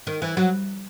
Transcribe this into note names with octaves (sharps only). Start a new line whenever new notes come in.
D#3
E3
F#3